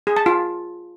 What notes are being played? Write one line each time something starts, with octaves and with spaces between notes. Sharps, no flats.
G#4
A5
F4